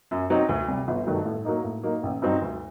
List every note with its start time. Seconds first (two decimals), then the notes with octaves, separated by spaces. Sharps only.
0.11 F#2
0.30 F#3 C4 D#4
0.49 D2
0.68 C3 G3
0.88 G1
1.07 G2 D#3 F#3 A3
1.25 A2
1.44 F#3 A#3 D#4
1.64 A2
1.83 F#3 A#3 D#4
2.03 A1
2.22 G2 F#3 C4 D#4
2.42 D2